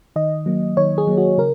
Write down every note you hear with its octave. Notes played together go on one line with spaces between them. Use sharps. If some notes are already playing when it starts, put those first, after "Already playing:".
D#3 D#5
F#3 A#3
D#3 C#5
G#4
F#3 A#3
F#4
C#3 A#4